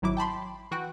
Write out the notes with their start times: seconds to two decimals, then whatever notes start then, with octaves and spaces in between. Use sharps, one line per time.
0.02 G#1 F#3 E4 D6
0.17 G5 A5 B5 C6
0.71 E3 F#4 G5 F#6